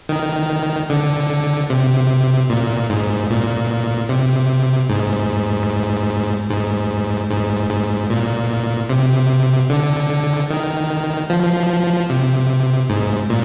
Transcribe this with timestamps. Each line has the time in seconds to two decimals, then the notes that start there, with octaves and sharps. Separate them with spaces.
0.09 D#3
0.90 D3
1.70 C3
2.50 A#2
2.90 G#2
3.30 A#2
4.09 C3
4.89 G#2
6.50 G#2
7.30 G#2
7.70 G#2
8.10 A#2
8.89 C3
9.70 D3
10.50 D#3
11.30 F3
12.10 C3
12.90 G#2
13.30 A#2